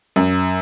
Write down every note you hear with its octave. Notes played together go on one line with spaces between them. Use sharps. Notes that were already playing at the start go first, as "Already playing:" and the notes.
F#2